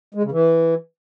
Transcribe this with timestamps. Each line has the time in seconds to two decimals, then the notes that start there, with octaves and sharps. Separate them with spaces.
0.14 G#3
0.23 C#3
0.32 E3